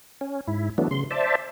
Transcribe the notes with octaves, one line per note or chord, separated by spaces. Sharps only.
C#4
G#2 E4
E3 F#3 A3 B3 D4
C#3 C6
C5 D5 E5 A5